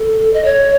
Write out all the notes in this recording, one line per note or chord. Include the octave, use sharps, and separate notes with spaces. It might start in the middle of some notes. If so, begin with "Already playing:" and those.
Already playing: A4
D#5
C#5